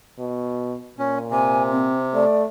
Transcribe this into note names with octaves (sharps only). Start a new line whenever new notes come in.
B2
A#2 C#4
C3 G#5
C4
A3 D5